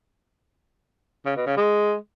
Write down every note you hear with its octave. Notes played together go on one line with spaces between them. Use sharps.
C#3
B2
C#3
G#3